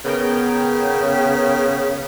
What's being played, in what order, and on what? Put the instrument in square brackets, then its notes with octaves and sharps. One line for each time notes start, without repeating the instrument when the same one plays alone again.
[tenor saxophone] C#3 [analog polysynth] B3 A#4 G5